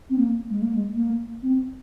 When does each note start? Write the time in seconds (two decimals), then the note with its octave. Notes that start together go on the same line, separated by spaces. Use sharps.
0.10 C4
0.17 A#3
0.49 G#3
0.62 A#3
0.74 G#3
0.95 A#3
1.42 C4